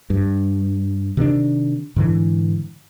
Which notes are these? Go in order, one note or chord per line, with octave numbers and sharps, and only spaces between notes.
G2
C3 D#3 C4 D4
G#2 D3 E3